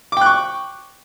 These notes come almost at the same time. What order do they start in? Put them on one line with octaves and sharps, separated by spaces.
D6 G5 F#6 C#6